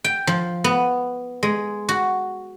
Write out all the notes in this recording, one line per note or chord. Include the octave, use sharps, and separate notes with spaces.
G5
F3
B3
G#3
F#4